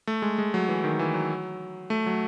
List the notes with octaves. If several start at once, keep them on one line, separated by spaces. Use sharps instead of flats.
A3
G#3
G#3
F#3
E3
D#3
E3
F#3
A3
F#3